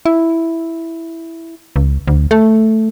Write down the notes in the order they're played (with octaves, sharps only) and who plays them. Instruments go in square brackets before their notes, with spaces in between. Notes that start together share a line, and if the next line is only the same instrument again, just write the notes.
[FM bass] E4
C#2
D2
A3